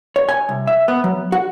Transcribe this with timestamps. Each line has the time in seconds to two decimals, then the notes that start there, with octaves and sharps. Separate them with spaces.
0.16 C#5
0.29 G#5
0.49 C2
0.67 E5
0.88 B3
1.04 F#3
1.32 F#4